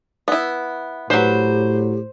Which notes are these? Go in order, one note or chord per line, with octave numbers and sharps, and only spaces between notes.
B3 E4
A2 F#3 G4 B4 C5